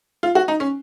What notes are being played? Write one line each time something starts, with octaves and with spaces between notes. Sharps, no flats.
F4
F#4
D#4
C#4